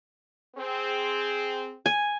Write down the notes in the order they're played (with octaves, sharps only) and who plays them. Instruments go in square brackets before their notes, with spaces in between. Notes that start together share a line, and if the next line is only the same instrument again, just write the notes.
[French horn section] C4 G#4
[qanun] G#5